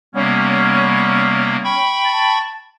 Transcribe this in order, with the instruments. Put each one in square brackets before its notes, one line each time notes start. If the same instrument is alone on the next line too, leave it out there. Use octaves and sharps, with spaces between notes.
[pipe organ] C3 A#3 [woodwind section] G3 B3 C#4
[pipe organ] G5 B5 C#6
[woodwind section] A5